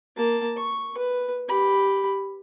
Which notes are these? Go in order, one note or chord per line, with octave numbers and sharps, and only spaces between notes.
A#3 A5
C#6
B4
G4 B5